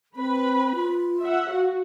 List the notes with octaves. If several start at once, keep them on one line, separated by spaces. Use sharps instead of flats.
C4 B4 B5
F4
E5 F#5
F#4 F5